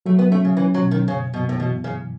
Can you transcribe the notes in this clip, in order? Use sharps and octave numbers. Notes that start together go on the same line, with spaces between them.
F#3 A3
B3
A3 C#4
C#3
E3 C#4
F#3
B2
D#3
F#2 C#3
F#2 B2
A2
B2 E3
F#2 C#3